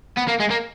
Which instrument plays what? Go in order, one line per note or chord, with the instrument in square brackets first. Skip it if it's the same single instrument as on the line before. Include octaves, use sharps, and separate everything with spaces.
[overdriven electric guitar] B3
A#3
G#3
A#3